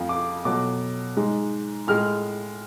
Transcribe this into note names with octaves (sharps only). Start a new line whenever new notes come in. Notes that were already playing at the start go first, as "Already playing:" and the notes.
Already playing: F2 F3 A3
D6
B2 F#3 A3 D6
G#2 G#3
A2 G#3 F6